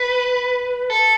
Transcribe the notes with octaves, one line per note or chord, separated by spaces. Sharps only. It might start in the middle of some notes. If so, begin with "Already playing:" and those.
Already playing: B4
A4